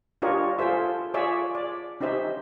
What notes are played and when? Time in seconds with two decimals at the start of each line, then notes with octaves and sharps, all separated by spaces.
0.22 D4 F4 G4 A#4 C#5 D#5
0.59 F4 G#4 A4 C5 E5
1.14 F4 G#4 C#5 D5 E5
1.55 D5
2.01 C#4 D#4 G4 C5 E5